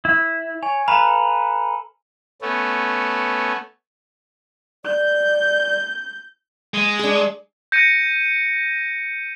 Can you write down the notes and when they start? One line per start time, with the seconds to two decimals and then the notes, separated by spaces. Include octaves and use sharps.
0.05 E4
0.63 C#5 G#5
0.88 A4 B4 F5 A#5 B5
2.41 A3 B3 C#4
4.85 D5 G6
6.74 G#3
6.99 D4 G#4
7.72 G6 A#6 C#7 D#7